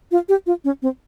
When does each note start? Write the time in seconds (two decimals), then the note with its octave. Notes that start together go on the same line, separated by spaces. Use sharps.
0.11 F4
0.29 G4
0.46 F4
0.64 C#4
0.82 C4